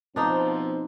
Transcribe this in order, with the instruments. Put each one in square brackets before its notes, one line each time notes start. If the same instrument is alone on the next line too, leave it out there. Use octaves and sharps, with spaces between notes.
[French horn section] B2 F3 C4 [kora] D4 D#4